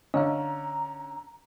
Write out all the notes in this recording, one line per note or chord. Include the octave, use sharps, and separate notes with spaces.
D3 C#4 D#5 F5 A#5